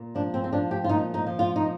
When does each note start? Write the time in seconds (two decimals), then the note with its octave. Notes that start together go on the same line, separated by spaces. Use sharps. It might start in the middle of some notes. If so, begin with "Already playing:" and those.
Already playing: A#2
0.15 F3 D4
0.34 C4
0.44 C4
0.52 F3 D4
0.71 G4
0.84 F4
0.89 A#2 D#4
1.14 D#4
1.27 F3
1.39 F4
1.56 D#4